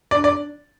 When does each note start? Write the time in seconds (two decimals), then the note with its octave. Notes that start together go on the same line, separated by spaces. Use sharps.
0.11 D4 D5
0.24 D5